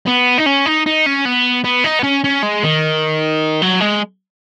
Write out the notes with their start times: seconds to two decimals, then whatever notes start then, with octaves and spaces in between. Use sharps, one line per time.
0.07 B3
0.38 D#4
0.46 C#4
0.66 D#4
0.86 D#4
1.06 C#4
1.25 B3
1.64 B3
1.84 D#4
1.99 B3
2.03 C#4
2.24 C#4
2.43 G#3
2.63 D#3
3.62 F#3
3.80 G#3